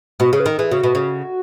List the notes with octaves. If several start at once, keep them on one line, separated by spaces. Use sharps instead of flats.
B2 F#4
C#3 G#4
B4
D#3 A#4
E3 G#4
C#3 F#4
B2
C#3